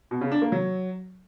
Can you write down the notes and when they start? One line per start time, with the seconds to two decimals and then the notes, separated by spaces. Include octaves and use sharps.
0.11 B2
0.21 C#3
0.32 D4
0.42 A#3
0.52 F#3